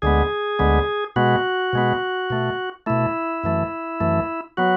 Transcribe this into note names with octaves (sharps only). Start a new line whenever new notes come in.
D2 D3 G#3 B3 G#4
D2 D3 G#3 B3
B2 G#3 B3 F#4
B2 G#3 B3
B2 A3
B2 A3 E4
F#2 E3 A3
F#2 E3 A3
F#3 B3 F#4